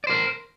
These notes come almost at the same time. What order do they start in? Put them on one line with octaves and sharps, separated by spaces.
D5 C5 A#4